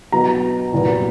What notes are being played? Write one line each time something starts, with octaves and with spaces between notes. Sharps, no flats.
B2 F#3 B3 A#5
C2 A#2 F#3 B3